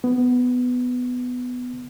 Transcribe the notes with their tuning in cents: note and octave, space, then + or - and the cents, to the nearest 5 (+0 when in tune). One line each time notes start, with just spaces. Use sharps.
B3 +10